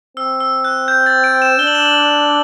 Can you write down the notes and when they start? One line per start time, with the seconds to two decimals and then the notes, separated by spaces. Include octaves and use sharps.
0.16 C4 E6
0.40 E6
0.65 F#6
0.88 G6
1.06 A6
1.24 D7
1.42 E7
1.59 D4 G7
1.67 F#7
1.75 E7
1.82 F#7